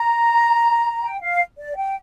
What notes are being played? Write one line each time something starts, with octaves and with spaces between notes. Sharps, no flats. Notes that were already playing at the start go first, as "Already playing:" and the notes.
Already playing: A#5
G5
F5
D5
G5